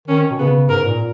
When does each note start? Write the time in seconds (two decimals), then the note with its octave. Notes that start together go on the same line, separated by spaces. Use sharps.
0.08 D#3 C#4
0.31 B2
0.39 C#3 B3
0.69 G#2 A#4
0.85 A#2